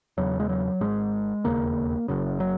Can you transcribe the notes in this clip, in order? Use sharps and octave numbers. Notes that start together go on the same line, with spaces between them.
E1 E2 C#3 F#3
G#3
F#3
G#1 G#2 G#3
E1 D#2 C#3 A#3
F#1 F#2 C#3
F#3